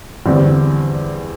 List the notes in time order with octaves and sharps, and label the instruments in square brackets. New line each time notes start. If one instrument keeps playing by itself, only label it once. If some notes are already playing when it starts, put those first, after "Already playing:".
[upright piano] E2 D3 G3 C4